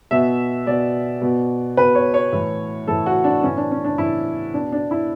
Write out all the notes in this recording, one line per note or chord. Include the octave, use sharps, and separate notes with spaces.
B2 E5
B2 D5
B2
B2 B4
C#5
C#5
A2 E3
A2 E3 A4
F#4
D4
A2 E3 C#4
D4
C#4
D4
A2 E3 E4
B2 D4
D4
E4